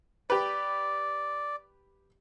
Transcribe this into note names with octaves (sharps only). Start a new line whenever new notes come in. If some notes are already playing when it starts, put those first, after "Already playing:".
G4 B4 D5